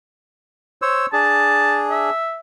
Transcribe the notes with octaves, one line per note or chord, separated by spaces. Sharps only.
C5 C#5 E6
D4 G#4 A5
E5